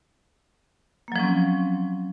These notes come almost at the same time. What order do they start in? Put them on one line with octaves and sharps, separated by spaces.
A#3 F#3 F3 C#4 C4